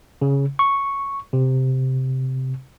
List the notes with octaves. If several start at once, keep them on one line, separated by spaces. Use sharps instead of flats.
C#3
C#6
C3